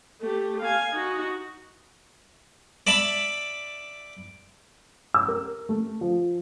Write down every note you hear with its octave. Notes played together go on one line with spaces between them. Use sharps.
A3 G4
F5 G#5
D#4 F#4
D5 E5 A5 B5
E6
A#4
A3
F3